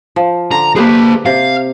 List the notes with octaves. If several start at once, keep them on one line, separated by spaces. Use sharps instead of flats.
F3
D3 A#5
A#3 G4 G#4 B4 C5
C3 F5